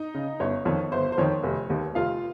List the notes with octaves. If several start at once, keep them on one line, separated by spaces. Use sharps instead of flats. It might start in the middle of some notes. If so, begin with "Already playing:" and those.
Already playing: D#4 D#5
C#3
G1 C#5
F2 D#3 C#5
G1 C5
C5
F2 D#3 C#5
F1
D#2 D#3
F1 F4 F5